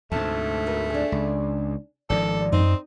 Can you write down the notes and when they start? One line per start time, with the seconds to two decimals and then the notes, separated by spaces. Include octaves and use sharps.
0.12 D2 G#2 C3 A3 A5
0.66 F#4 A#4 B4
0.90 D4 G#4
1.12 C#2
2.10 G#1 D#3 F3 A4 D5
2.52 F#2 C4 D#4 D#5